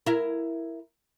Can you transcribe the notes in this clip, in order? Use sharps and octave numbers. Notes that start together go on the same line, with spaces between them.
E4 A#4